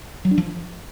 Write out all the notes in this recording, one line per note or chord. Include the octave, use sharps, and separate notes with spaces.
F#3
D4
F3